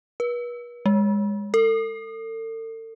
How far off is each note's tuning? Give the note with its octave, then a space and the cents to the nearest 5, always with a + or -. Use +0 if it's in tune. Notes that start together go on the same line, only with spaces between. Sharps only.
B4 -40
G#3 -25
A4 +40